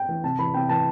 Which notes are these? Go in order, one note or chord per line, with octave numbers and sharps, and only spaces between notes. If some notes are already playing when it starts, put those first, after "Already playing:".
Already playing: G5
E3
C3 A5
E3 B5
C3 G5
E3 A5